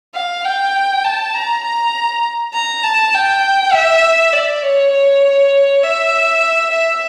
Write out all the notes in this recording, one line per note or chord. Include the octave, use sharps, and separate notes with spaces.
F5
G5
A5
A#5
A#5
A#5
A5
G5
E5
D5
C#5
C#5
E5
E5